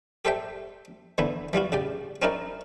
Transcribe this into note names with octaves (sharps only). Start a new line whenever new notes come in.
G4 A4 C5 D5 E5 G5
D3 E3 B3 E4
E3 G3 F4 F#4
C#3 G4 D5
C4 C#4 D#4 E4 A#4 D5